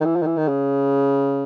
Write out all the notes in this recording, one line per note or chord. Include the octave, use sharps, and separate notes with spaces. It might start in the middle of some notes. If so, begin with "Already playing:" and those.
D#3
E3
F3
D#3
E3
D#3
C#3